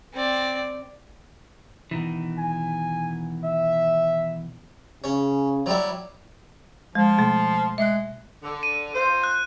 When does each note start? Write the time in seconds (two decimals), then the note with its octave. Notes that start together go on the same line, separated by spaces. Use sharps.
0.14 C4 D5
1.91 B2 D#3 E3
2.39 G#5
3.44 E5
5.04 C#3 C#4
5.66 F#3 G3 E4
6.95 F3 G#3
7.18 B2 A3
7.78 G#3 E5 F#6
8.43 D3
8.63 D#7
8.95 C4 F4 C5
9.24 F#6